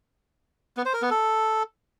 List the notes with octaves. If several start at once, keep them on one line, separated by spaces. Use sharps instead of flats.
B3
C5
A#4
B3
A4